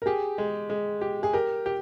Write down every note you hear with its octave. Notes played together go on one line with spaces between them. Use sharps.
A#4
G4 G#4
G#3
G#3
G4
G#4
G4 A#4
G4